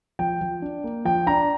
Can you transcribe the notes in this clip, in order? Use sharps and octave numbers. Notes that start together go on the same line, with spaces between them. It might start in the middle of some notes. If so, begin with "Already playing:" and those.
F3 G5
F3
D4
A#3
F3 G5
D4 A#5